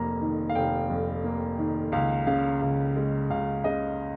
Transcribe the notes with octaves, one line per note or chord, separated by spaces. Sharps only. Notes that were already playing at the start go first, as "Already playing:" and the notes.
Already playing: F1 F2 A#3 A#5
D#3
F5
F1 G5
F2
A#3
D#3
C#2 F5
C#3 F5
C#2
G#3
C#2 F5
C#3 D#5